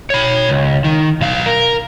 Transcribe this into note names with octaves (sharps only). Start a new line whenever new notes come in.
C#5 B5
C#2
D#3
B1 F5
A#4